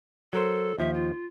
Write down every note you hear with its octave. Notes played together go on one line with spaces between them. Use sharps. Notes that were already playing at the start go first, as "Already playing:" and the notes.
F#3 A4 A#4 C5
D#2 F3 E5
F4